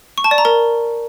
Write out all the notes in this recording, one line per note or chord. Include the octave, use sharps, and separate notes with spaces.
C#6
A5
D5
A#5
A#4